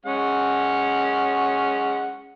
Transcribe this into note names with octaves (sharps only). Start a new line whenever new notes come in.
G#3 C#4 F#5